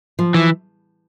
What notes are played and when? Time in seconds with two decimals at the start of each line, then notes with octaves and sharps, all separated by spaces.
0.19 F3
0.34 E3